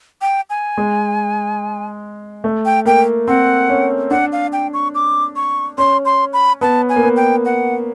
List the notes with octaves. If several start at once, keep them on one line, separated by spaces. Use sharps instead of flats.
G5
G#5
G#3
A3
G5
A#3 G5
C4 F#5
C#4
D4 F#5
F5
G5
C#6
D6
C#6
C#4 C6
C6
B5
B3 A5
G#5
A#3
B3
G5
F#5